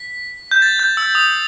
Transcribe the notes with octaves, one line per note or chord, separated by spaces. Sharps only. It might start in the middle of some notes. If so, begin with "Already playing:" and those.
Already playing: B6
G6
A6
G6
E6
D#6